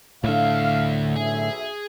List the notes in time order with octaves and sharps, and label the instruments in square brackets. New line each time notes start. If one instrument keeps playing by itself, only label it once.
[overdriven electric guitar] D2 E5 [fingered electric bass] A2 D3 [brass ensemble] F5
[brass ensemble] B1 E5 [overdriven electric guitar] G#4